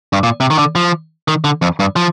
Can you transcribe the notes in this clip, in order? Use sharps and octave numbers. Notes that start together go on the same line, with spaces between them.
G2
A#2
C3
D#3
D3
F3
D#3
D3
F2
G2
F3